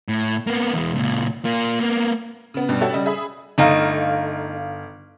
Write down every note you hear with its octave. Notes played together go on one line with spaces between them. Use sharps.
A2
A#3 B3
E2 G#3
C#2 A#2
A#3 F4
A#3 B3
C#3 B3
G2 B2 G3
F#4 G4 A4 C#5 E5
C#3 G3 D#5
G#4 E5 B5 D#6
G1 A3 D#4 F5 D7